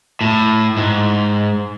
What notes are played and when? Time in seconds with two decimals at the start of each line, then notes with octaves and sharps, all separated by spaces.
0.21 A2
0.77 G#2